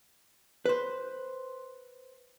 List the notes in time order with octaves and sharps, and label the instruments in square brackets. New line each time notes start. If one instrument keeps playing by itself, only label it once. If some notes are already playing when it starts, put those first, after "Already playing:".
[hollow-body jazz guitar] B4 C5